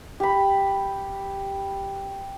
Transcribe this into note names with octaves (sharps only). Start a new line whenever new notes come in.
G4 B5